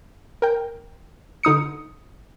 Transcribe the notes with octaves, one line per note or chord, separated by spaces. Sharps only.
A#4 G5
D3 D#4 D#6 C#7